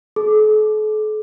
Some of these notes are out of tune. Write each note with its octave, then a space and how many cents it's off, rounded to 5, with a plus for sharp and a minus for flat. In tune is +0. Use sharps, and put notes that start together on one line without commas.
A4 -45